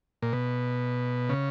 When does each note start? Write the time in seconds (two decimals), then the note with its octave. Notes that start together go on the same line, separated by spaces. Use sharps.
0.22 A#2
0.33 B2
1.29 C#3